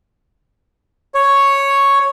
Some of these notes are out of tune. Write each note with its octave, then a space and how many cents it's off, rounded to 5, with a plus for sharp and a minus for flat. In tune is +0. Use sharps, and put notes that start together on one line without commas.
C#5 +0